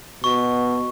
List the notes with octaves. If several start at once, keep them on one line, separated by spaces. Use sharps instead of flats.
B2 C#6